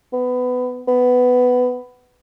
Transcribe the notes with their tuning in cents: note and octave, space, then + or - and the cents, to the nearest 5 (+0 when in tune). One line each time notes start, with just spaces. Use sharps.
B3 +20
B3 +10